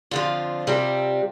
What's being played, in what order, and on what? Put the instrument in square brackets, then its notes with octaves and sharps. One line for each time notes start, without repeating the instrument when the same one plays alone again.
[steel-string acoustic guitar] F2 D3 F3 F4
C3 G3 C4